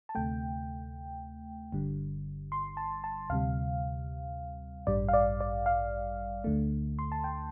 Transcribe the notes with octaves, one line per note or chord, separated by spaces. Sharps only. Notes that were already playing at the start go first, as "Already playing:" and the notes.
A5
D2 C3 A3 G5
G1 G2 D3 G3
C6
A5
A5
D2 C3 G3 F5
A1 G2 G3 D5
F5
D5
D5
F5
D2 D3 A3
C6
A5
G5